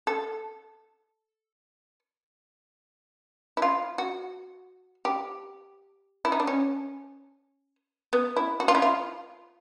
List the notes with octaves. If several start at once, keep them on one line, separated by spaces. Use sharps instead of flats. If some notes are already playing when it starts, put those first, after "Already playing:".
A4
E4
F4
F#4
G4
E4
D#4
D4
C#4
B3
E4
F#4
F4
E4
F4